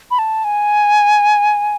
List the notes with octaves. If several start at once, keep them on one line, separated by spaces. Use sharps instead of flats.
B5
A5
G#5